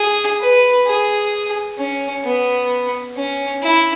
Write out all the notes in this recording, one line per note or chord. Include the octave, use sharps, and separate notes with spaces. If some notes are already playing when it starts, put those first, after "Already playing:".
Already playing: G#4
B4
G#4
C#4
B3
C#4
E4